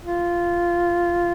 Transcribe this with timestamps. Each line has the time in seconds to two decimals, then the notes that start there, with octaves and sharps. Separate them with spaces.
0.04 F4